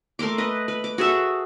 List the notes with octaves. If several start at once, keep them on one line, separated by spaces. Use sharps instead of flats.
A3 A#4 C6 D6
B4 D#5
B4
D6
F#4 G#4 A4 E5